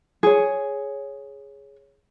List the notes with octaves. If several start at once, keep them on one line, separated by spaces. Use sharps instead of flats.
G#4 C#5